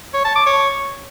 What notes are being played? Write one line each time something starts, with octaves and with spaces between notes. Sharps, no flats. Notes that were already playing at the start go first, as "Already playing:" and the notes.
C#5
A5
D6
C#5